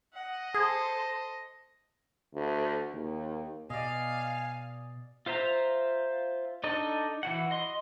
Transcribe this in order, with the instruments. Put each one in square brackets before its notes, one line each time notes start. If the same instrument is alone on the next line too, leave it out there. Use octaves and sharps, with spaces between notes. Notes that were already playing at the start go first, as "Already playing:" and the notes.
[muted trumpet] D#5 [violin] F#5
[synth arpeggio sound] G#4 [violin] A4 C5
[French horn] D2
D#2
[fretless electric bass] B2 [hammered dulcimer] D5 D#5 [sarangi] F5 [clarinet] G#5
[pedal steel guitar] F4 C5 E5 A#5
D4 D#4 A4 D#5
E3 F#4 F#5
D#5 C6